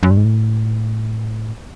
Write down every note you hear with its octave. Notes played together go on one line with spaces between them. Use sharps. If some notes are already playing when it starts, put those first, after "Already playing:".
F#2
G2
G#2
A2